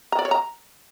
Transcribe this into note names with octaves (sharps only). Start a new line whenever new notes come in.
A#5
D5
C#5
A#5